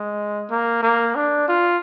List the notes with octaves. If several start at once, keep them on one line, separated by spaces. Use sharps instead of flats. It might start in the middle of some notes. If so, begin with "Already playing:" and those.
Already playing: G#3
A#3
A#3
D4
F4